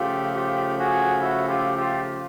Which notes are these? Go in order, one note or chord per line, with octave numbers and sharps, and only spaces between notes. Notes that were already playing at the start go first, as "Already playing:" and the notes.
Already playing: C#3 F3 A3 F4 G4
F4 G4
F#4 G#4
E4 F#4
F4 G4
F4 G4